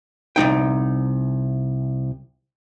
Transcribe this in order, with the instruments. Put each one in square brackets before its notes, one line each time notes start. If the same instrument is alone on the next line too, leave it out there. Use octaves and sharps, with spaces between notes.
[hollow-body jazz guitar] C2 F3 D#4 G5